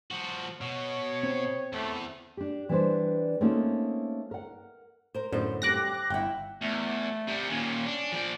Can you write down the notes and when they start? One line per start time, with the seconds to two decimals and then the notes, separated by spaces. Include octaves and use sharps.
0.11 F3 F#4
0.61 B2 C#5
1.23 C4
1.73 E2 A3
2.37 D4 G4
2.69 E3 G3 B3 D4 B4 C5
3.41 A3 A#3 C4 C#4 D#4 F#4
4.31 A#4 F#5
5.14 A#4 C5
5.33 F#2 A2 D3 B3 C5
5.62 D2 G3 C4 D6 F#6 A#6
6.10 G1 E4 F#5 G5
6.62 E2 A3
7.27 C3 G3
7.49 D#2 A#2 C#4
7.86 D4
8.12 F3 D5